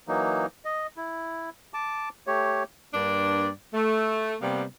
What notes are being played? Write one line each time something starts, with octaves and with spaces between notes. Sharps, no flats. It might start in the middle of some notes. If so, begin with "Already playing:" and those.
E3 F#3 A#3 D#4
D#5
E4
A5 D6
A3 G4 C#5
G2 A#3 D4 D5
A3
C3 G3 A#3 B3